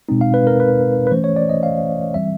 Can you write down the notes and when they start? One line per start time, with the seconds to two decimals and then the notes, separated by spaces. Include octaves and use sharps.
0.09 B2 G#3 C4 D#4
0.21 F5
0.34 B4
0.47 A#4
0.60 B4
1.07 B4
1.11 E3 A3 C#4 C5
1.24 C#5
1.36 D5
1.49 D#5
1.63 F5
2.14 E3 G3 C4 E5